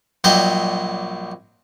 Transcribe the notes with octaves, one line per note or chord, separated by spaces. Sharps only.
A#1 F#3 G3 D#5 G5